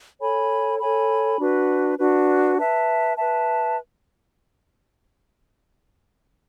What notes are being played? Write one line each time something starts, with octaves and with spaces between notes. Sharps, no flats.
A4 C#5 G#5 B5
A4 C#5 G#5 B5
D4 F#4 B4
D4 F#4 B4
B4 E5 A5
B4 E5 A5